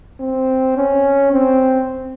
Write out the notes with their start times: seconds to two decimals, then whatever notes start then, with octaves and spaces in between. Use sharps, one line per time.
0.21 C4
0.77 C#4
1.33 C4